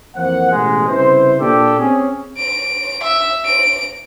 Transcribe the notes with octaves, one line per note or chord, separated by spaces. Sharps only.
F2 E3 A#3 C5 F#5
A1 B2 G#3 G#4
C2 C#3 E4 B4 C5
A#2 D4 G4 A4
C4 C#4 G#4
D7
E5
D7